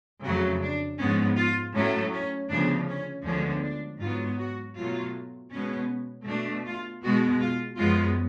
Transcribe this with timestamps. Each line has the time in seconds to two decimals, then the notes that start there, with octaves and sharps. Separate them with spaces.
0.23 F2 C#3 F#3 A3 F#4
0.61 D4
0.98 G#2 F3 B3 C#4
1.36 F4
1.74 A2 F#3 A3 C#4
2.12 C#4
2.49 D2 C#3 F3 B3 D4
2.87 C#4
3.25 D2 D3 F3 G#3 B3 C#4
3.63 D4
4.00 G#2 F#3 B3 F4
4.38 F#4
4.76 B2 F#3 A3 F4
5.51 B2 G#3 B3 C#4
6.27 B2 A3 D4
6.65 F4
7.02 B2 G#3 B3 F#4
7.40 F4
7.77 F#2 F3 G#3 B3 F4